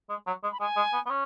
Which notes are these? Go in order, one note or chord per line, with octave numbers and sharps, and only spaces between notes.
G#3
F#3
G#3
B5
G#3 G#5
G#3
B3
B3
C#4